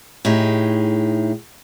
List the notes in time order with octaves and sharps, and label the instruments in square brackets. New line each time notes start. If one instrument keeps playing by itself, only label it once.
[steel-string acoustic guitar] A2 D#4 G4 G#4